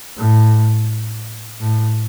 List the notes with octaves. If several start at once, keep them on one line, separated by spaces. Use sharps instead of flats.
A2
A2